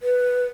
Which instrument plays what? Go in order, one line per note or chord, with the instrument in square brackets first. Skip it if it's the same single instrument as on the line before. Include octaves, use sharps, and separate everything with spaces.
[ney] B4